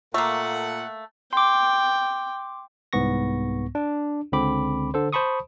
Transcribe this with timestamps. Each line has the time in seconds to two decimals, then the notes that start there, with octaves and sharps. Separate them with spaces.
0.14 A#2 A3 A#3 A4 F#5
1.33 G5 C6 D6
2.93 C2 G#2 B3 C#6 A#6
3.75 D4
4.32 C#2 D3 C4 B5 D6
4.94 D3 A4 C5
5.13 C5 A5 B5 C#6 D#6